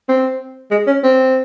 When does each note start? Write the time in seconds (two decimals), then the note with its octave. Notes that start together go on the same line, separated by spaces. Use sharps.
0.09 C4
0.71 G#3
0.87 C#4
1.04 C4